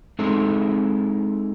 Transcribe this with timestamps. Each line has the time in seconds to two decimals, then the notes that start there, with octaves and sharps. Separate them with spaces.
0.19 G#3 C4 D#4 E4 G#4 A4